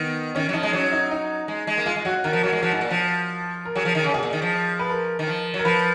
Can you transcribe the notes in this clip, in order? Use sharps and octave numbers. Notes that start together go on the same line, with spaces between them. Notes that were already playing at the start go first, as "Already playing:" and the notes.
Already playing: D#3 B3
D#3 C#4
F#3
F3 D#4
G#3
F#3 C#4
D#4
D#4
G#3
G#3
A#3
G#3 F4
G#3
F#3 F#4
D#3 A#4
F3
F#3 F#4
G#3
F3 F#4
G#2
A#2
F3
A#4
F#3 G#4
F3
D#3
C#3
B2 G#4
A#2
D#3
F3
B4
A#4
D#3
F3
F#3
A#4
F3 B4